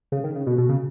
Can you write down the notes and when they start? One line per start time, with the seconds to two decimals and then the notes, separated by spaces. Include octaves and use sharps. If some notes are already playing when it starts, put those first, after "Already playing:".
0.12 C#3
0.24 D#3
0.35 C#3
0.46 B2
0.58 B2
0.69 C#3